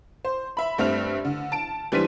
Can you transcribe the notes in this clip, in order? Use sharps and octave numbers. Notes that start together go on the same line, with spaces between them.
C5
E5 B5
G2 A3 C4 E5 F6 F7
D3
A5 D7
E3 G3 D4 C5 B6 D#7